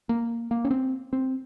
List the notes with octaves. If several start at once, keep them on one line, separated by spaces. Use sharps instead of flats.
A#3
A#3
C#4
C4
C4